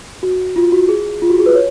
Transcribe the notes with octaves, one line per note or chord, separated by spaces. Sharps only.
F#4
F4
F#4
G#4
F4
F#4
G#4
B4
C#5